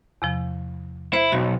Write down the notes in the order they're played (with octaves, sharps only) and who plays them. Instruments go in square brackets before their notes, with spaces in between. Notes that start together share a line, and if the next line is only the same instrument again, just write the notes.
[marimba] E2 C3 F3
[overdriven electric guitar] E4 [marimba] C5
[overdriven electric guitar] B1 [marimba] F#4